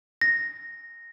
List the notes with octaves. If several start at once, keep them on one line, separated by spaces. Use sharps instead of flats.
A#6